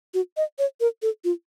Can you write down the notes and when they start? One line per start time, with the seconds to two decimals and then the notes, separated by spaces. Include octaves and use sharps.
0.14 F#4
0.37 D#5
0.59 C#5
0.80 A#4
1.02 A4
1.24 F4